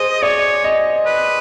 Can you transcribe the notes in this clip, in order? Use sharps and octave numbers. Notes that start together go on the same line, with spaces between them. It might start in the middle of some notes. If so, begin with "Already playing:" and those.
Already playing: G#4 C5 D#5
C#5 D5
D#5
B4